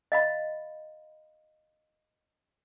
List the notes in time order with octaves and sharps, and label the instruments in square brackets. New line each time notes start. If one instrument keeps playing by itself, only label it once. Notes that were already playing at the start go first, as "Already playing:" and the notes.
[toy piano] D#5 F5 B5